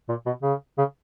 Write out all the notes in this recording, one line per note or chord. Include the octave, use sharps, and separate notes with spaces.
A#2
B2
C#3
C#3